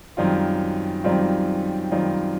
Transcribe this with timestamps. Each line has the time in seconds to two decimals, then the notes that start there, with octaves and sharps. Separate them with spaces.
0.17 F#2 D#3 G3 C4 F4
1.04 F#2 D#3 G3 C4 F4
1.91 F#2 D#3 G3 C4 F4